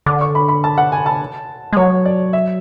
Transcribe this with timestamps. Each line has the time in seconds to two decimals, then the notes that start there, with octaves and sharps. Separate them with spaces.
0.06 D3 D6
0.21 C#6
0.35 B5
0.48 B5
0.64 A5
0.78 F#5
0.92 G#5
1.06 A5
1.73 G#3
1.77 F#3 C#5
2.05 D5
2.33 E5